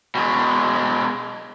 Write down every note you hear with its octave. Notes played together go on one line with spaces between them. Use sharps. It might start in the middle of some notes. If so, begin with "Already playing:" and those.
B2 G#3